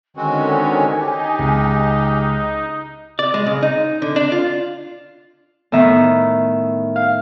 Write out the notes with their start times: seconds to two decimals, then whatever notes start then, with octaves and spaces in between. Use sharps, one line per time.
0.17 D3 D#3 G#3 C4 C#4 F#4 G#5
0.99 D#4 G4
1.39 C#2
3.19 D5
3.34 G#3
3.46 C#3
3.62 D#4
4.02 D3
4.16 D4
4.32 F4
5.72 A2 D#3 B3 E5 A#5
6.96 F5